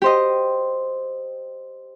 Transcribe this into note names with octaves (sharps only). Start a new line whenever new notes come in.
G4 C5 D#5